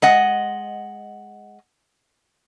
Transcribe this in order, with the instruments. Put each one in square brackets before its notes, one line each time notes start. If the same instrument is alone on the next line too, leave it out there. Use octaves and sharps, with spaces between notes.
[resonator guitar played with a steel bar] G#3 D#5 F#5